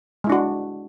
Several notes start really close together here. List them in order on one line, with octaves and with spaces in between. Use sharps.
G#3 E4 D4 F#4